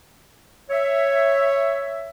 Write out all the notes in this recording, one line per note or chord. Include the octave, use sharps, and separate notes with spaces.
C#5 E5